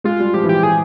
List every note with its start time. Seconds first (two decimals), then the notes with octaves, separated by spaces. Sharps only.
0.04 G#3 F4
0.20 G3
0.34 F3 G4
0.44 E3
0.49 F3 G4
0.63 G#4